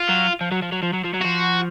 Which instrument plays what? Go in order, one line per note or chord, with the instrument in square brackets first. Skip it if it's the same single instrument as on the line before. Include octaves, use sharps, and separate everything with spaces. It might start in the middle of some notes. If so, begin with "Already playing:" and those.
Already playing: [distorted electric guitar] F4
[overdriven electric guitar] F#3
F3
F#3
F3
F#3
F3
F#3
F3
F#3
[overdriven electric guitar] F3 [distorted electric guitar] F#4